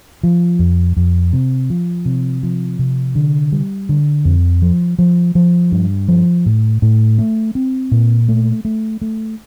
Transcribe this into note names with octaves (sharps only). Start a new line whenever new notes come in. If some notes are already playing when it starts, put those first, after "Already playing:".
F3
F2
F2
C3
F3
C3
F3
C3
D3
G3
D3
F2
F3
F3
F3
G2
F3
A2
A2
A3
C4
A#2
A3
A3
A3